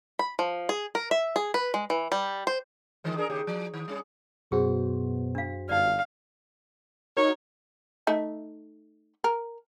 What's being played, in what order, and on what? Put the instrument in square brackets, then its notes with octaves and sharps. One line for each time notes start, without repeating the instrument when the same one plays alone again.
[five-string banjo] B5
F3
G#4
A#4
E5
G#4
B4
G#3
E3
G3
C5
[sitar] D#3 E3 G#3
D4 G#4 A#4
D#2 C#3 G4
F3
D#3
G3 C#4 G#4
[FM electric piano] F#2 F#4 C5 [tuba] B2 [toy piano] G#4
[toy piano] D4 F5
[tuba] G1 [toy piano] D#4 D5 [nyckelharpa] F5
[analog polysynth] D#4 F#4 A#4 [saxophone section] C#5
[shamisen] A3 D#4 E5
A#4